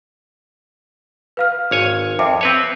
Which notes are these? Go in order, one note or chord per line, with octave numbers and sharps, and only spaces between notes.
B4 F5 F6
G#1 C#5 G#5
F2 E5 D6
C4 B4 C#5